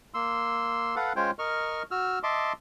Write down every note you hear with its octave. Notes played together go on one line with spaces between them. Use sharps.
A#3 C6 E6
A4 B4 F5 F#5
G#3 C#4 F4 C5 C#5 G5
A#4 D#5 C#6 F6
F#4 E6 F6
D#5 E5 A5 C6 D6